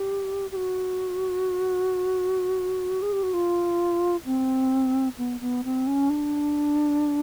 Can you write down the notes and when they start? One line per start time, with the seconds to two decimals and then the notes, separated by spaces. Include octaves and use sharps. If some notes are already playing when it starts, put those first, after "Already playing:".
Already playing: G4
0.52 G4
0.56 F#4
3.02 G#4
3.12 G4
3.23 F#4
3.33 F4
4.25 C4
5.18 B3
5.41 B3
5.64 C4
5.87 C#4
6.10 D4